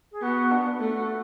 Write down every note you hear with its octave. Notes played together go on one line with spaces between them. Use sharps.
G#4
B3 F#4
D4
A3 F#4
F#4